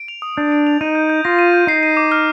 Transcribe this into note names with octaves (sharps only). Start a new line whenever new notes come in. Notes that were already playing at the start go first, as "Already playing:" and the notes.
Already playing: D7
F7
D#6
D4 G6
D7
F7
D#4 D#7
G6
G6
F4 A#6
D#7
G6
D#4 C7
D#7
D6
F6